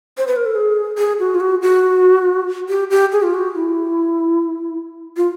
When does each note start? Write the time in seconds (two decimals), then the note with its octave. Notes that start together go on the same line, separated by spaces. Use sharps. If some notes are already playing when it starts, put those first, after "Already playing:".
0.18 C5
0.27 B4
0.36 A#4
0.46 A4
0.55 G#4
0.98 G#4
1.19 F#4
1.35 F4
1.40 F#4
1.62 F#4
2.69 G4
2.90 G4
3.12 G#4
3.23 F4
3.34 F#4
3.55 E4
5.17 F4